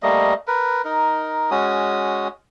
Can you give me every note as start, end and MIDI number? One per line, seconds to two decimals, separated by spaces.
0.03 0.34 55
0.03 0.34 57
0.03 0.34 58
0.03 0.34 75
0.47 0.82 70
0.47 0.82 71
0.85 1.50 63
0.85 1.50 70
1.51 2.28 56
1.51 2.28 61
1.51 2.28 66
1.51 2.28 87